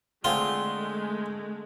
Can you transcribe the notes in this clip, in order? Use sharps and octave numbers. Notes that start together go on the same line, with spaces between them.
D3 G#3 A3 C4 F4 G#4